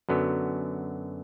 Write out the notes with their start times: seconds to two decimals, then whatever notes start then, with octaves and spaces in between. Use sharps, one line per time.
0.09 F#2 D3 F#3 B3